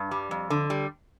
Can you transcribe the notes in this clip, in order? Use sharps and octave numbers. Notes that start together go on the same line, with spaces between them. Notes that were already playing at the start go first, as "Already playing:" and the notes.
Already playing: G2
G3
F2
D3
G3